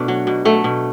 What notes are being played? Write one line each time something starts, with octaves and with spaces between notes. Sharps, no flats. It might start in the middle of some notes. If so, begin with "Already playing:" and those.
Already playing: B2 A3 B3 D4
F#3
B2
F#3 A3
B2